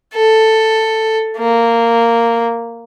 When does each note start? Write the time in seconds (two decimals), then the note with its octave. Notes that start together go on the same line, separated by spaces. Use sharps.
0.14 A4
1.38 A#3